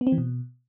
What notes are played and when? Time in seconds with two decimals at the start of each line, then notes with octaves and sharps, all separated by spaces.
0.01 B3
0.07 C4
0.12 E3
0.18 B2